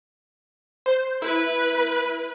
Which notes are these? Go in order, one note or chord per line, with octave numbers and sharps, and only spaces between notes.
C5
E4 B4